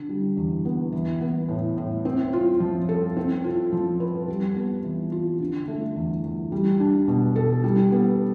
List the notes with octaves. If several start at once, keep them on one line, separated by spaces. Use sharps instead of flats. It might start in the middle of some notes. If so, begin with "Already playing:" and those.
Already playing: D3
G3
E2
B3
E3
B3
A2
A2
C4
F4
F3
A4
C4
F4
F3
B4
G3
B3
E3
F4
D3
A3
E2
E2
G3
D4
B2
A4
G3
B3